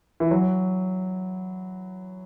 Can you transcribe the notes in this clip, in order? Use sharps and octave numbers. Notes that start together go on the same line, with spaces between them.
E3
F#3